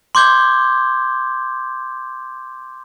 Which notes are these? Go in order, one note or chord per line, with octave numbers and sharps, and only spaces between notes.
C6 D6 G6 G#6 G7